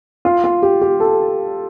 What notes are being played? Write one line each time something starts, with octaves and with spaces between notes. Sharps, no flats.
F4
F4
G4
G4
A4